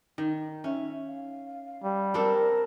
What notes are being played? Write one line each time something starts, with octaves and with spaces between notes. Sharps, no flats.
D#3
C#4 E5
F5
G3
C4 D4 A4 A#4